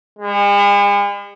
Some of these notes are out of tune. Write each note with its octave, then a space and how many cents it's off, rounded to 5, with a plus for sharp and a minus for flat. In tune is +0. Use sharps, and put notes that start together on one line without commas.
G#3 -45